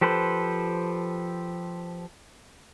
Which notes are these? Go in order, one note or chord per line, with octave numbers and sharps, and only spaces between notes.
F3 G4 A4 B4 C5